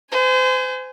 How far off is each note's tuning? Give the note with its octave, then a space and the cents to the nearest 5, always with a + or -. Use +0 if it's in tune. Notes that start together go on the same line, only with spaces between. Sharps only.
C5 -35 G#5 +0